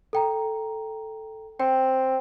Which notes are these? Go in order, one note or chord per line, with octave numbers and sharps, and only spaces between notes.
A4 G5 A#5
C4 G5